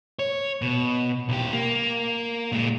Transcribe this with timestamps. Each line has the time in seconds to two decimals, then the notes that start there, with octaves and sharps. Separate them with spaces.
0.19 C#5
0.62 B2
1.29 B1 G4
1.53 A#3
2.52 A#2 G#3